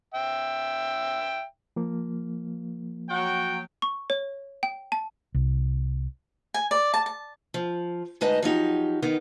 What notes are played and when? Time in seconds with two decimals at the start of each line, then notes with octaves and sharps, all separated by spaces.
0.14 E5 G5
1.76 F3 A#3
3.10 F#3 F#4 G5
3.82 C#6
4.10 C#5
4.63 G5
4.92 A5
5.34 C2
6.54 G#5
6.71 D5
6.94 A5
7.06 A5
7.54 F3
8.21 D2 G#3 D#4 B4 D#5 A5
8.42 F3 F#3 D#4 G4
9.02 D#3 B3 D#4